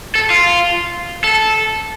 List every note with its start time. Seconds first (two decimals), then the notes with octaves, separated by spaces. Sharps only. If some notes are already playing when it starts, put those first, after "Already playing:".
0.15 A4
0.30 F4
1.24 A4